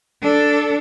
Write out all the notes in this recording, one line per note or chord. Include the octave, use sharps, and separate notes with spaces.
D4 A4